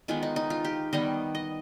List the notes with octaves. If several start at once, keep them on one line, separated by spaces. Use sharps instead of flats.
D#3 G#3 B3 F4
D#4
D#4
F4
G4
D#3 G3 B3 D#5
D#5